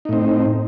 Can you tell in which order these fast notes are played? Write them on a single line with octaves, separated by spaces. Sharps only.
D#4 A2 C4